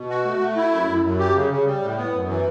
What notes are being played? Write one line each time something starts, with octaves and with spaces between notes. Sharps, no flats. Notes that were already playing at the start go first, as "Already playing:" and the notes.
Already playing: B2
F#4
A3
A3
E4
F#2
F#2
F#2
G4
C#3
C#3
G3
A2
B3
F#2
E3